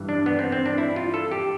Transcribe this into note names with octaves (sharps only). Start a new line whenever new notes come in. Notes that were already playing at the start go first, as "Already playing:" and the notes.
Already playing: G2 E3
D4
B3
C4
C4
D4
E4
F4
A4
G4